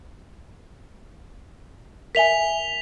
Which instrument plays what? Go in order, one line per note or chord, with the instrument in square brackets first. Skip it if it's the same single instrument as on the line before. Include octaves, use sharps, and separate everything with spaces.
[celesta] A#4 E5 G#5 [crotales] B6 F7 G7